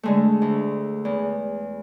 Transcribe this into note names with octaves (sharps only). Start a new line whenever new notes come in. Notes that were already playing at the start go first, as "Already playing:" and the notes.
D3 G#3 A3
D2
E2